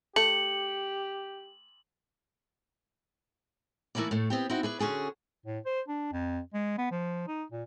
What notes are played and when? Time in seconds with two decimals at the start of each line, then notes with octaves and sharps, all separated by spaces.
0.16 A3 G4 C#7 F#7
3.95 E3 A3 A#3 E4 B4 D5
4.11 A2 A3
4.30 B3 C4 G4
4.50 C4 D#4 E4 F#4
4.63 G#4 B4 D5
4.79 D3 C#4 F#4 G#4 A4
5.46 A2
5.65 C5
5.88 D4
6.12 F2
6.54 G#3
6.78 B3
6.91 F3
7.27 D#4
7.52 A#2